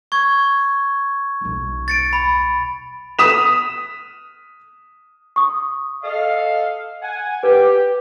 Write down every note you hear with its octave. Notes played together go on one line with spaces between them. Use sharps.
C#6 G#6
D#1 B1
A6 C#7 D7
B5
D#6 B6 E7 F7
C#6 D#6
A4 D#5 F5
F#5 G#5
G4 B4